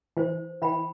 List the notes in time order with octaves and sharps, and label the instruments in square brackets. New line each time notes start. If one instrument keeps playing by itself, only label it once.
[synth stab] E3 [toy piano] C5
[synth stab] E3 [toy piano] G5 B5